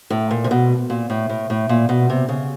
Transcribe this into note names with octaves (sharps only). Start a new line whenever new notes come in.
A2
A#2
C3
B2
A#2
A2
A2
A2
A#2
B2
C3
C#3